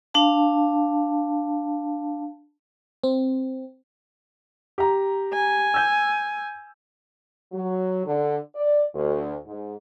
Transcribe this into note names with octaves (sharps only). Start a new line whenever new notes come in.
D4 F5 A5
C4
G4 A#5
G#5
E6 G6
F#3
D3
D5
D2
G#2